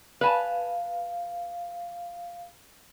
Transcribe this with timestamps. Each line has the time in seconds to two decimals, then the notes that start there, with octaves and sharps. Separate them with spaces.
0.21 B4 F5 G#5 A5